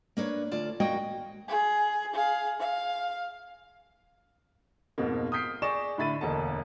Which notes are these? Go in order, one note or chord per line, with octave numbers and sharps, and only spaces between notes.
A#3 D4 B4 C#5
D2 F4 D5 A5
F#2 G#3 A#3 F#4 D#5 G5
G#4
G#4 F5
F5
F2 G#2 B2 A#3
D#6 F6 G6 B6 C7 D7
G#4 D5 C#6 A#6 E7
A2 D3 E5 B5 A6 D#7
E1 D2 A#3 D#5 F#5 A5